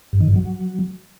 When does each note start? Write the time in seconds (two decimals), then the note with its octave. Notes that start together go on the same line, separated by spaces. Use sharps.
0.13 G2
0.21 D#3
0.28 G2
0.36 F#3